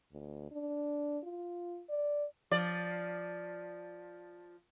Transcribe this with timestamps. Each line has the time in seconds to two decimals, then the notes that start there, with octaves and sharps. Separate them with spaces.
0.13 D2
0.51 D4
1.23 F4
1.89 D5
2.51 F3 D5